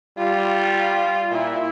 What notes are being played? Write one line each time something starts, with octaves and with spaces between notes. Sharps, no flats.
G3 F4
A#2 E4